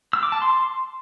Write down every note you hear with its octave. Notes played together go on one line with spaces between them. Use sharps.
E6
D6
A5
C6